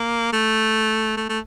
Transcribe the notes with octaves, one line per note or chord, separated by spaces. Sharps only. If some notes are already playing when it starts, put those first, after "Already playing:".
Already playing: A#3
A3
A3
A3